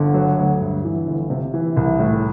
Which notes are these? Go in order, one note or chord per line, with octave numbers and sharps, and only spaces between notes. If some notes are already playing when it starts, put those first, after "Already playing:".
Already playing: G1 D3
F#3
D2
G2
E3
G1
C3
E3
C2
A2